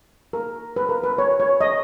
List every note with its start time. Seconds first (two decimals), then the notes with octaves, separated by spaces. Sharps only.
0.33 A#4
0.76 B4
0.89 A#4
1.04 B4
1.18 C#5
1.40 C#5
1.61 D#5